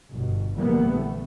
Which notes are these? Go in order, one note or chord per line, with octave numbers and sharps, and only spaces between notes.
G1 B2
A#1 D3 E3 G3 A#3 B3
A3